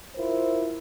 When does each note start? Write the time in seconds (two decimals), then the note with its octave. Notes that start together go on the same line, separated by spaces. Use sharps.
0.15 E4 F4 A#4 C5